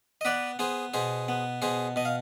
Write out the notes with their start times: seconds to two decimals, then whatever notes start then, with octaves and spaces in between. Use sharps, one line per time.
0.21 D#5
0.25 B3 B4 D5
0.59 B3 G#4 C5
0.94 B2 G#4 C5
1.28 B3
1.62 B2 G#4 C5
1.96 B2 D#5
2.05 F5